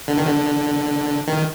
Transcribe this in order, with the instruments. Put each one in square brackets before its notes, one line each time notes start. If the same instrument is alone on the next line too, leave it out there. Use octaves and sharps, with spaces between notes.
[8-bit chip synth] D3
D#3
D3
D#3